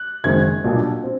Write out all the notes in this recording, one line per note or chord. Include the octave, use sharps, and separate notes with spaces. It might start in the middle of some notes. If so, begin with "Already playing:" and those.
Already playing: F#6
F#1 F#2 D#3 G#3 C4 G#6
B1 A#2 G3 A#3 D4
C4